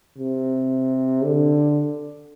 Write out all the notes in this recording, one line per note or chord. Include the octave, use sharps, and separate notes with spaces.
C3
D3